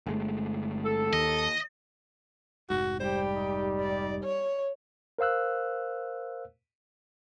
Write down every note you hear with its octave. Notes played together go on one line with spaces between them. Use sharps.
G1 G#3 A3
A4
D#2 D#5
F1 G#2 F#4
G3 G4 C5
D#4
D5
C#5
A#4 C5 F5 E6 F#6